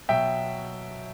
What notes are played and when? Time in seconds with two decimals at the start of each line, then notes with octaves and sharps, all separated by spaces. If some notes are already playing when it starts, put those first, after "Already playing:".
0.09 B2 F#3 E5 G5